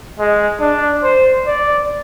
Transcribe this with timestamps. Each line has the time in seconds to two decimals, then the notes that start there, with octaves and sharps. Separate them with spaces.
0.19 G#3
0.61 D4
1.03 C5
1.47 D5